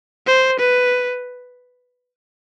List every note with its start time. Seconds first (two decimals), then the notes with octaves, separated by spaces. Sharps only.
0.27 C5
0.60 B4